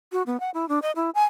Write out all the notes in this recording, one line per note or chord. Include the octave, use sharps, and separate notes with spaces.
F#4
B3
F#5
E4
D4
D#5
E4
G#5